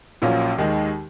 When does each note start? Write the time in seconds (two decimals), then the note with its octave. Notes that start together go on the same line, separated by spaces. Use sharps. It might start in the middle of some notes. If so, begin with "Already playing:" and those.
0.22 A#1 A#2 F#3 C#4 F4
0.58 D#2 D#3 G#3